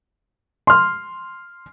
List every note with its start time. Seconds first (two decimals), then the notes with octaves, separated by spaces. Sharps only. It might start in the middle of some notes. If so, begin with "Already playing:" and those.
0.67 C6 F6